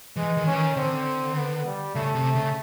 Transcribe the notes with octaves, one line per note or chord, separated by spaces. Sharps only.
E3 G#3
D#3
E3 C#4
D#3
D3 C4
B3
G3
C#3 A3
C3
C#3